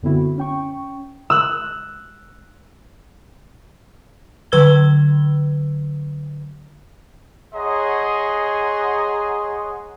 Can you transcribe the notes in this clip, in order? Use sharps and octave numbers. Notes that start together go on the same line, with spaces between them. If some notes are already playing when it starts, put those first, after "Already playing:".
F#2 D3 B3 C4 E4 F#4
C#4 G5 C#6
E6 F#6
D3 F#3 B4 E6 G#6 G7
G#4 C#5 D#5 F#5 A#5 C6